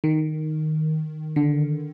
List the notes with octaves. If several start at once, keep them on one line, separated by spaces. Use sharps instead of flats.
D#3
D3